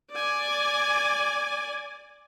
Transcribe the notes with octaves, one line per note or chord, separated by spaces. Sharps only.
D5 G#5